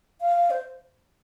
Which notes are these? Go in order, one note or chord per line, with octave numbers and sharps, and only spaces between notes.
F5
C5